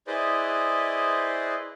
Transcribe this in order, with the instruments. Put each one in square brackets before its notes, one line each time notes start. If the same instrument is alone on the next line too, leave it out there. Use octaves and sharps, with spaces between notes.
[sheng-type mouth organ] E4 G#4 B4 C5 D5 D#5